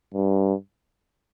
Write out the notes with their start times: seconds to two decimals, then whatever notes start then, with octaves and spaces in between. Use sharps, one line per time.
0.14 G2